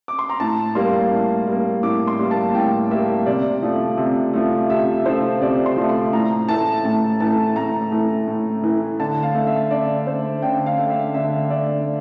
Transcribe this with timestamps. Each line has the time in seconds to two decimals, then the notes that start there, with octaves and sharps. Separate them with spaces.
0.08 D6
0.19 C6
0.29 A#5
0.40 A2 A5
0.75 G3 A#3 C6
1.11 A2
1.47 G3 A#3
1.83 A2 D6
2.07 C6
2.19 G3 A#3
2.31 A5
2.55 A2 G5
2.91 G3 A#3 E5
3.26 C3 D5
3.63 F3 A3
3.98 C3
4.33 F3 A3
4.70 C3 E5
5.06 F3 A3 C5
5.41 C3 D5
5.66 C6
5.77 F3 A3
5.89 C6
6.13 A2 A#5
6.49 E3 A3 A5
6.85 A2 A5
7.20 E3 A3 A5
7.56 A2 A#5
7.92 E3 A3
8.27 A2
8.64 E3 A3
9.00 D3 A5
9.23 F5
9.35 A3
9.47 E5
9.71 D3 D5
10.07 A3 C5
10.42 D3 G5
10.66 F5
10.78 A3
10.90 E5
11.14 D3 E5
11.50 A3 D5